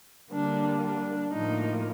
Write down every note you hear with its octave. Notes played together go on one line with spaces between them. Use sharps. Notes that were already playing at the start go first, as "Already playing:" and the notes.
D3 G3 A#3 D4
D4
A2 F3 A#3 D#4